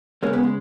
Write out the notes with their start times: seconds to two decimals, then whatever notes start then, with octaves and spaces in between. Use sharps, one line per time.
0.23 C#3 G#3 A#3 C#4
0.33 G#3 B3
0.43 G#3